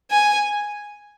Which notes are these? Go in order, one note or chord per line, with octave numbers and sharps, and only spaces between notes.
G#5